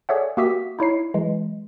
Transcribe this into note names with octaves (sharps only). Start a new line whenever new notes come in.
G#4 A4 C#5 D5 E5 F#5
A#3 F#4 G4 E5 D#6 B6
D#4 E4 C#5 C7
E3 F#3 G#3